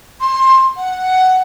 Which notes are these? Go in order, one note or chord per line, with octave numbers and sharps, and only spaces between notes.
C6
F#5